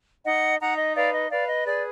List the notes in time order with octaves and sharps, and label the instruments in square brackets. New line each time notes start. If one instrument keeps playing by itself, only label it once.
[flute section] D#4 D#5 F#5
D#4 F#5 A#5
D#5
B4 D5 F5
D#5
B4 D5 F5
D#5
G#4 D5